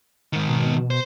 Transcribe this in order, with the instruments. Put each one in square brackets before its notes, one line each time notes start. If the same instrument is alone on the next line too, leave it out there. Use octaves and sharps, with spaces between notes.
[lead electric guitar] G#2 D#3
[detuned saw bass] B2
[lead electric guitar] C5